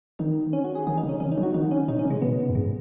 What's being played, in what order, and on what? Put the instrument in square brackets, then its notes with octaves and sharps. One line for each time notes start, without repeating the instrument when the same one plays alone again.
[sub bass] D#3 [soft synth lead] D#4
[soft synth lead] C#4
F#4
G#4
[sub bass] D#3 [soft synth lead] G#4
[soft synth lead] D#4
[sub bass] C#3
[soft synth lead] C#4
[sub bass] D#3 [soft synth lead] C#4
[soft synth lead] D#4
[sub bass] F#3
[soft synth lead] F#4
[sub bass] D#3 [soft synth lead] D#4
[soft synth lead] C#4
[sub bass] B2 [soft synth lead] D#4
[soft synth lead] C#4
[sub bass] C#3
[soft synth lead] G#3
[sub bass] B2 [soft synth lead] B3
[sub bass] F#2
[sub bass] G#2 [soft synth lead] G#3